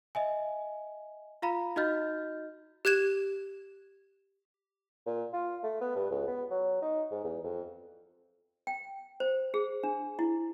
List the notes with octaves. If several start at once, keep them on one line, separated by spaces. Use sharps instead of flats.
D#5 E5 G#5
F4 F5 A#5 B5
D#4 F#4 D#5 F6 G6 A6
G4 F#6 G#6 E7
A#2
F4
A3
B3
G2
C#2
B3
F#3
D#4
G#2
E2
F2
G5
C5
G#4
D4
E4